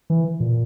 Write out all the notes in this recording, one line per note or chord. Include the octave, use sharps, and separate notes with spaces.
E3
A#2